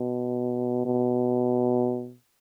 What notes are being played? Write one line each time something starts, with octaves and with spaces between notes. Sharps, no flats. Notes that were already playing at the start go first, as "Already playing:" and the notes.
Already playing: B2
B2